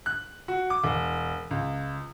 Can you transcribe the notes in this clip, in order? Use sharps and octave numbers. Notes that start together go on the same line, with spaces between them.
F#6
F#4
D6
E1
C#2